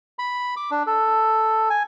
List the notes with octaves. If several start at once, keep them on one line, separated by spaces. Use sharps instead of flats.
B5
D6
D4
A4
G#5